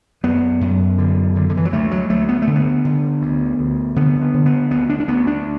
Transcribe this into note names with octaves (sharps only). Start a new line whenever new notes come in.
F#2 B3
F#2
D3
D3
D3
E3
F#3
D2 A3
F#3
D2 A3
B3
A3
D3
B3
D3
D2
D2
D3 B3
B3
D3
B3
D2 B3
D4
D4
D2 B3
D4